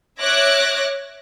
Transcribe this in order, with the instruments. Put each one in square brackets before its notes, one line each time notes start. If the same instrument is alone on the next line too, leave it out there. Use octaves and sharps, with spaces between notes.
[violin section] C#5 E5 D6 F#6 G#6 A#6